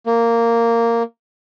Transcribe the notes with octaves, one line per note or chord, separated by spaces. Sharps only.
A#3